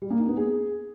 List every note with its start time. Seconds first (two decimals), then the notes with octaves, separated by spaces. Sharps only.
0.02 G3
0.10 A#3
0.19 D#4
0.28 B3
0.37 G#4